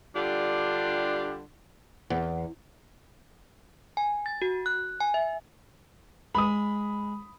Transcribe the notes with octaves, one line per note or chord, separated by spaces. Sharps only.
D3 G3 D4 F4 G4
E2
G#5
A6
F#4
F#6
G#5
E5
G#3 B5 D#6